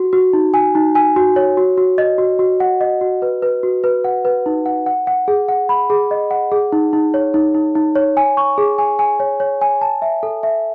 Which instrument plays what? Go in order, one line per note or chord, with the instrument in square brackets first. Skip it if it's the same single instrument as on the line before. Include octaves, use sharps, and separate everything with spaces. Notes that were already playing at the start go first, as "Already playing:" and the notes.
Already playing: [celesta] F#4
F#4
D#4
G#5
D#4
G#5
F#4
C#5
F#4
F#4
D#5
F#4
F#4
F#5
D#5
F#4
B4
B4
F#4
B4
F#5
B4
D#4
F#5
F#5
F#5
G#4
F#5
B5
G#4
D#5
F#5
G#4
D#4
D#4
C#5
D#4
D#4
D#4
C#5
G#5
C#6
G#4
G#5
G#5
C#5
C#5
G#5
A5
E5
A4
E5